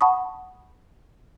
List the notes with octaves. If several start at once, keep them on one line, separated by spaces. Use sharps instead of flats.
F#5 A5 B5 C#6 D#6